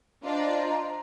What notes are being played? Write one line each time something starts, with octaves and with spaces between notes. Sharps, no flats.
D4 F4 C5 D5 D#5 A#5